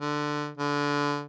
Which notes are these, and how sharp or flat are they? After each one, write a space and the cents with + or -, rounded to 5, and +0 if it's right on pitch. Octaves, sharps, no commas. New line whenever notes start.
D3 +10
D3 -20